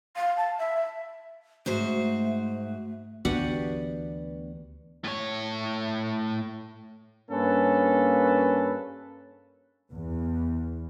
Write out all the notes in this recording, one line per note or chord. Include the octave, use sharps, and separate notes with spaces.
F5
A5
E5
G#2 A3 F#4 C5
D2 E3 B3 D4 F#4 G4 F#5
A2 C#5
G2 A#3 C#4 A4 B4
E2